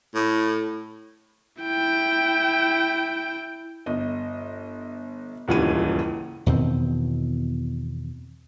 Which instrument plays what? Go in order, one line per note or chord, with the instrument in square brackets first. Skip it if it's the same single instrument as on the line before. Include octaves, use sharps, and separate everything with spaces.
[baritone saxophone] A2
[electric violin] E4 G5
[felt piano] G1 D#5
D#1 C#2 G2 E3 G3 D#7
[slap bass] E2 B2 D#3 C4